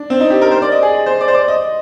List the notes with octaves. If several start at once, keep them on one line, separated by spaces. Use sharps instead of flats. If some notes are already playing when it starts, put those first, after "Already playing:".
Already playing: D4
C4
D#4
G4
A#4
C5
D5
D#5
G#4
C5
D5
C5
D5
D#5